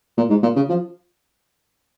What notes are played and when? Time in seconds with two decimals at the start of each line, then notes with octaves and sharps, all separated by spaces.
0.17 A#2
0.30 G#2
0.43 A#2
0.56 C#3
0.69 F3